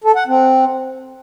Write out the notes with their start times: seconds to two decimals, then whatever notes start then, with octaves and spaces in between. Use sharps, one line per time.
0.04 A4
0.16 F#5
0.27 C4